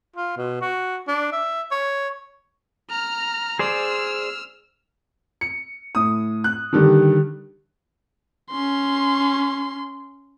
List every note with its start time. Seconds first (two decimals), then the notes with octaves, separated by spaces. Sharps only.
0.16 F4
0.37 B2
0.62 F#4
1.08 D4
1.33 E5
1.71 C#5
2.90 A#5 F6
3.59 G#4 C5 D5 E6 F6
5.41 C#7
5.95 A2 D#6
6.44 F#6
6.73 D3 D#3 G3 G4
8.51 C#4 C6